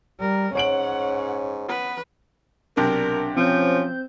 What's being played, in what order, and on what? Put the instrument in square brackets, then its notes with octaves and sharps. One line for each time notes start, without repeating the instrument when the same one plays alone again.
[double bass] G3 [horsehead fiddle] A#4
[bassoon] G#2 [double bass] C#4 [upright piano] C#5 D7 F#7 [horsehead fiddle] F#5
[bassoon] B3 [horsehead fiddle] B4
[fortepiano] B1 C3 [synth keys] D4 [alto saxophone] A#4
[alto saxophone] F3 [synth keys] C4 C5 G6 [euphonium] C#4